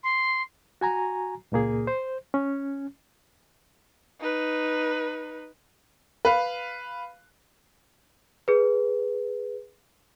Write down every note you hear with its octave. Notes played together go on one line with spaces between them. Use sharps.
C6
F#4 G#5 A#5
C#2 A#2 A#3 G#4
C5
C#4
D#4 B4
B4 F5
G#4 B4